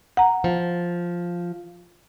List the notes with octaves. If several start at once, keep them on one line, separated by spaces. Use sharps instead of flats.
F#5 A#5
F3